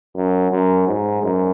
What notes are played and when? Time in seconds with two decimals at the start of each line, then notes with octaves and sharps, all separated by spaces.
0.15 F#2
0.51 F#2
0.87 G#2
1.23 F#2